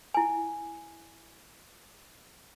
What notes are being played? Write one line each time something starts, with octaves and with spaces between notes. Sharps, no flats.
E4 G#5